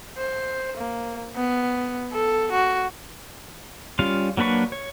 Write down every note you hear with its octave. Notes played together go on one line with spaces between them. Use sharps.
C5
A#3
B3
A4
F#4
G3 C#4 F4 F5
F#3 A#3 D4 B4 C#6
C#5